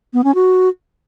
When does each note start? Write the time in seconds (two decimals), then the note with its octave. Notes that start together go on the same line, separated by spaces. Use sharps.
0.13 B3
0.24 C#4
0.35 F#4